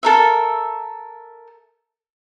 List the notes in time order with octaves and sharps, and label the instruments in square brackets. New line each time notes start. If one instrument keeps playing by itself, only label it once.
[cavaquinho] A4 A#4 E5